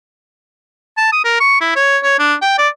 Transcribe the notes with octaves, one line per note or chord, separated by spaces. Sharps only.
A5
D#6
A#4
C#6
E4
C#5
C#5
D4
G5
D5